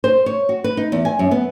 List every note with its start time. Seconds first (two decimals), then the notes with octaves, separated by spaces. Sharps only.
0.04 C5
0.26 C#5
0.49 F#4
0.64 B4
0.77 D#4
0.92 E2
1.05 G#5
1.19 F#2
1.31 B3